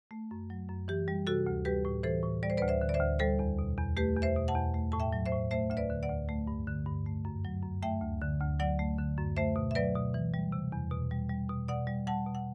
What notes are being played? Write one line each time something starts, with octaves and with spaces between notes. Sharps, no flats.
A3
F#2
F#3
F#2
E3 G4
G3
C3 F#4 A4
D2
G3 G4 B4
A2
E3 A4 C5
A2
G3 D5
C5
D2 B4 D5
C5 E5
D3
D5
C5 E5
D2
G3 A4 C5
E2
B2
E2
A3 G4 B4
E2
C5 E5
B2
F#5 A5
E2
A3
A2 A5
E5 G5
F#3
C5 E5
A2
A3 C5 E5
D2 E5
B4 D5
D3
D5 F#5
D2
A3
G2
D3
G2
A3
F#2
F#3
F#2
A3 E5 G5
D2
D3
D2
F#3 D5 F#5
A3
D3
F#2
A3 C5 E5
B2
E5
F#3 B4 D5
B2
E3
G3
C3
E2
B2
G3
G3
B2
B2 D5 F#5
G3
G3 F#5 A5
B2
F#5